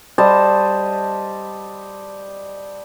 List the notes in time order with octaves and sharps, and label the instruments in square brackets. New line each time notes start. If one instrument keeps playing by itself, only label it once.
[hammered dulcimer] G3 C5 D#5 A5